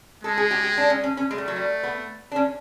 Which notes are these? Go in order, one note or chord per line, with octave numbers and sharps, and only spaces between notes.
G#3 A4
G#4
G4
G4
D4
C#4
C#4
C#4
G#3 A3
G3
F#3
G3
B3
D4
C#4